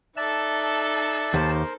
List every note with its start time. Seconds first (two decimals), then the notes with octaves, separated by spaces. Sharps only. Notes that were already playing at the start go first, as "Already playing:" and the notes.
0.17 D#4 A4 D5 E5 A5 F#6
1.34 D#2 A#4 C5